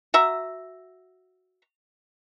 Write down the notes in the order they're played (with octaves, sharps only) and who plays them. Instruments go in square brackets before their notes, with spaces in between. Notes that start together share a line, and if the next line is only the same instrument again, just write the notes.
[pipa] F#4 E5 A#5